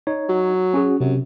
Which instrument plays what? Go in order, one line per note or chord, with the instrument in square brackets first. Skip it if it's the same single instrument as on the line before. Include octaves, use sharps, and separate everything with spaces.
[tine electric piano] D#4 C#5
[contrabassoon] F#3
[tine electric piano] C#4 F#4 G#4
[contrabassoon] F#2 [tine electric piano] C3